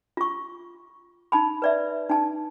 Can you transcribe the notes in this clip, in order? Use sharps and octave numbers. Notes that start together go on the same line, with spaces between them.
F4 C#6
D#4 A5 B5
B4 D5 E5
D#4 A5